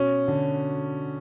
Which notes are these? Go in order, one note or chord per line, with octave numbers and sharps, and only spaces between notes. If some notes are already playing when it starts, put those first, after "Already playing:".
Already playing: B2 C#4
D3